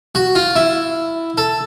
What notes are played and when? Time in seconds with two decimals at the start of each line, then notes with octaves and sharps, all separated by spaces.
0.15 F#4
0.35 F4
0.56 E4
1.38 A4